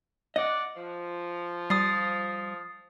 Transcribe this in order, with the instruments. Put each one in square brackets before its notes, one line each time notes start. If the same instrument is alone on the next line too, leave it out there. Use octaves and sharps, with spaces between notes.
[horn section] D5 F#5 [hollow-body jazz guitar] D#5
[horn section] F3
[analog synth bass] G3 [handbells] D#6 A6 C7